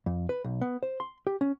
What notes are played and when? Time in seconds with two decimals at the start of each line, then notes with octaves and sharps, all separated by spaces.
0.06 F2
0.29 B4
0.44 B1
0.61 B3
0.83 C5
1.00 C6
1.27 G4
1.41 C#4